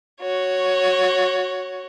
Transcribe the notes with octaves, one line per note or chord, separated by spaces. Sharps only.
F#4 C#5